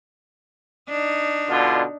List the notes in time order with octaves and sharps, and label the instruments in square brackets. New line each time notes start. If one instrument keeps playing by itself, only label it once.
[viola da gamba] D4 D#4
[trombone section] B2 D3 F4